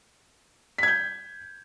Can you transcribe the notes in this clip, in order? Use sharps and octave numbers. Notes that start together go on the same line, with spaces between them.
G6 G#6 B6